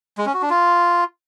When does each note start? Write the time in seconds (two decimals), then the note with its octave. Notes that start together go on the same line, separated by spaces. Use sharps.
0.18 G#3
0.26 C#4
0.34 F#4
0.42 D4
0.50 F4